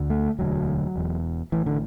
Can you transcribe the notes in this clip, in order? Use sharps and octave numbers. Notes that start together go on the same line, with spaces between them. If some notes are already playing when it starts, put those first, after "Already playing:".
Already playing: D2 D3
A3
E1 D2 D3 F#3
E1 E2 B2
A1 A2 E3
D3